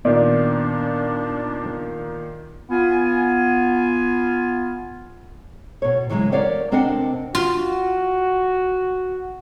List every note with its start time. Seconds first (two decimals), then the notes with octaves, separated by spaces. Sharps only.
0.05 A#2 D#3 B3 D4 D5
2.70 B3 F4 G#5
5.82 B2 C#5
6.10 C#3 E3 F#3 G#3 E4
6.32 G4 A#4 C#5 D5 F5 F#5
6.71 C3 C4 D4 A#4 D#5 F#5
7.35 F4 F#4